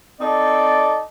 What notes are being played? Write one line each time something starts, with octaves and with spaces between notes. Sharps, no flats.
C4 D#4 A4 D5